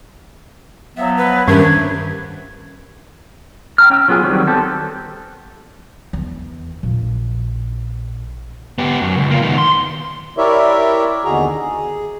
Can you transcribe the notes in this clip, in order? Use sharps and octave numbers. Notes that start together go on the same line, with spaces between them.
F3 F#3 B3 E5
B4
G2 D#3 A3 C#4 D4 G4 A#4 G#6
G5 A#5 F6
C#4 G5 E6
F#3 B3 F4 G#4 G#5
D#3 F#3 G3 C4
B3 C4 G4 A4 C5
E2
A#1
B3 G4
F#2
C#2
A#3 F4
D#3 B3
C6
E4 G4 A#4 C#5 D5 E5
D#2 B2 D3 F#4 G#4 A#5
G#4